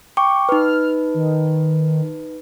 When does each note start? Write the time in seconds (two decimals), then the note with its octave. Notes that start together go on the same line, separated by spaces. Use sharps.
0.17 G5 C#6 D6
0.49 D#4 B4 F6
1.14 D#3